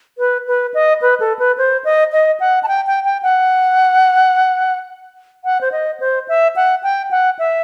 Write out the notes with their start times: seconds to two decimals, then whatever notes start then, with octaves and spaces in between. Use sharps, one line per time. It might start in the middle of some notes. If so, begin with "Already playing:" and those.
0.18 B4
0.47 B4
0.74 D#5
1.02 B4
1.20 A4
1.39 B4
1.58 C5
1.85 D#5
2.12 D#5
2.40 F#5
2.63 A5
2.68 G5
2.87 G5
3.05 G5
3.23 F#5
5.45 F#5
5.61 C5
5.72 D#5
6.00 C5
6.29 E5
6.56 F#5
6.83 G5
7.11 F#5
7.39 E5